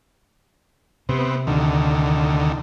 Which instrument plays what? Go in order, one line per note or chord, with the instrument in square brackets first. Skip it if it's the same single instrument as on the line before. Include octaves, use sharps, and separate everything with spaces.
[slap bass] C3 [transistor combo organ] B3 C4
[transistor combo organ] D2 D3 D#3